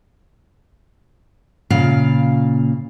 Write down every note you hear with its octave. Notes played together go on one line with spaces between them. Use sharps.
A#2 C#3 F5